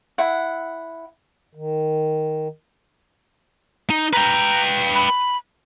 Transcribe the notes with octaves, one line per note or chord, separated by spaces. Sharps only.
E4 F#5
D#3
D#4
B4 G5 A#5
B5